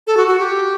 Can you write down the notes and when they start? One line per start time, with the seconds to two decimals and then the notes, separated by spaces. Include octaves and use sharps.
0.07 A4
0.17 F#4
0.28 F#4
0.39 G4